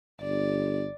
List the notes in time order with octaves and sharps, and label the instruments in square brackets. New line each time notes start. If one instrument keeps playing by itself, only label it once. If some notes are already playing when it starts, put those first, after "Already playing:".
[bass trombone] G1 [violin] D5